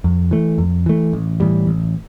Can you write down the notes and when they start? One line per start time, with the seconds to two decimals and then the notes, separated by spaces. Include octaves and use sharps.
0.04 F2
0.31 E3 A3
0.58 F2
0.86 E3 A3
1.13 A1
1.40 A2 E3 G3
1.67 A1